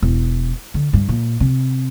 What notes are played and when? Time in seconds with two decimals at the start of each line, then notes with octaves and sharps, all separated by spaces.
0.02 E1
0.74 D3
0.93 G2
1.09 A#2
1.40 C3